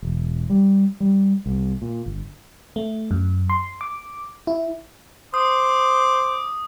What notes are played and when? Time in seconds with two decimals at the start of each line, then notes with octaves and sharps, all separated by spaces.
0.03 E1
0.50 G3
1.00 G3
1.46 C2
1.82 A#2
2.06 G1
2.76 A3
3.11 F#2
3.50 C6
3.81 D6
4.47 E4
5.34 C5 D6 D#6